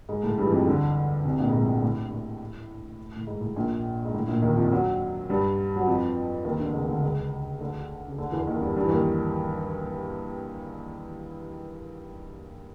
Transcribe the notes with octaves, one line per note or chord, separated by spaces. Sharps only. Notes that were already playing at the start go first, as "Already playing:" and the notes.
G#2 G#3
A2 A3
G2 G3
E3
F2 F3
D2 D3
C2 C3
A#1 A#2
G#2
A2
G#2
A2
A2
A2
G#2
A2
A#1 A#2
G#2
A2
A#1 A#2
D#2 D#3
F2 F3
F#2 F#3
G2 G3
F#3
F2 F3
D#2 D#3
D2 D3
C#2 C#3
D2 D3
C#2 C#3
D2 D3
C#3
D2 D3
E2 E3
D#2 D#3
G2 G3
G2 G3
E3
D#2 D#3